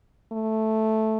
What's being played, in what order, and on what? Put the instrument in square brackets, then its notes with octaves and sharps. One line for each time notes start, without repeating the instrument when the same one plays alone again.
[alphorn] A3